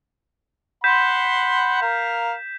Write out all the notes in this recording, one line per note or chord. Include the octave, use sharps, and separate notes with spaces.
F#5 B5 C6 G6 B6 E7
A#4 F5